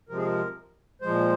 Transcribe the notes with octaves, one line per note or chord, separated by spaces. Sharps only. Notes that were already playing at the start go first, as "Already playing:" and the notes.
C3 F3 G#3 A#4
G#4
A#4
A#2 F3 G#3 C5